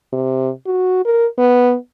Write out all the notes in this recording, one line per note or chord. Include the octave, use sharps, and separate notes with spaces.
C3
F#4
A#4
B3